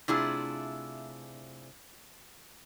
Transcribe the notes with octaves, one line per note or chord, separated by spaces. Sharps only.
C3 A3 D4 E4 F4 G#4